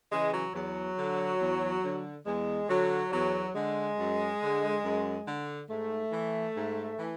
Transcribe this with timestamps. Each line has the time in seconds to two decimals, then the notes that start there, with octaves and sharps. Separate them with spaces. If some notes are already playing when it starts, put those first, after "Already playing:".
0.11 C#3 E3 G#3
0.33 F#3
0.54 E2 F#3
0.98 D3
1.41 E2
1.83 D3
2.26 E2 G#3
2.69 D3 F#3
3.11 E2 F#3
3.55 D3 G#3
3.97 F#2
4.41 D3
4.84 F#2
5.27 D3
5.69 G#2 A3
6.12 E3
6.56 G#2
6.99 E3